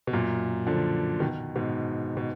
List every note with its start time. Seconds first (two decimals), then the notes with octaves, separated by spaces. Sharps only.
0.07 B2
0.13 F#2 A#2
0.67 D3 F3
1.20 B2 D#3
1.56 G#2 B2
2.17 B2